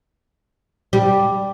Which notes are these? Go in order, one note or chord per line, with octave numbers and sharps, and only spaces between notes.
G3